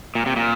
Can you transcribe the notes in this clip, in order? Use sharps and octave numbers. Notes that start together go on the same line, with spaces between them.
A#2
C3
A#2